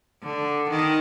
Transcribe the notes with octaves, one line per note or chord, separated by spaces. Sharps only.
D3
D#3